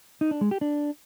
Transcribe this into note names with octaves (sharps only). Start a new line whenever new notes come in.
D#4
D4
G#3
G4
D4